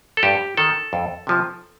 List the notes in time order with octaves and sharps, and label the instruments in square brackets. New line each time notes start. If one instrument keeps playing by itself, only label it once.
[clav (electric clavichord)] A4
G2 G4
D#3 A4
F2
C3 F3